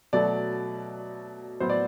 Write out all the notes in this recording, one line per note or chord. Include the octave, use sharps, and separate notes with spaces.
B2 F#3 A3 D5
A2 F#3 B3 C5
D5